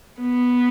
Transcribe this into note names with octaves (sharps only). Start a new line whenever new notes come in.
B3